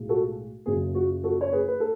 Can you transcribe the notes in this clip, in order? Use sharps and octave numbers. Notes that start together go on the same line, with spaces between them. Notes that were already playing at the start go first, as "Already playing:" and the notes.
Already playing: B1 A2 G#3
F#4 A4
F#1 F#2 C#3 G#4
F#4
F#4 A4
C#5
G#4 B4
B4
A4